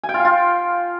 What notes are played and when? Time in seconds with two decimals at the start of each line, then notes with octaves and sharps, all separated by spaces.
0.03 G#5
0.09 G5
0.14 F4
0.19 F5
0.25 F4